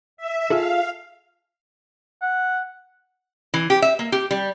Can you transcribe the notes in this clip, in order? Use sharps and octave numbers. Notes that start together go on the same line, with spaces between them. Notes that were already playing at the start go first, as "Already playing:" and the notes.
E5
F4 G#4 A4 F5
F#5
E3
G4
E5
A#3
G4
G3